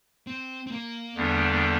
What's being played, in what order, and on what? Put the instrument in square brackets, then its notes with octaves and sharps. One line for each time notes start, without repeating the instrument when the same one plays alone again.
[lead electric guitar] C4
C4
A#3
[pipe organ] E2 D3 G3 D4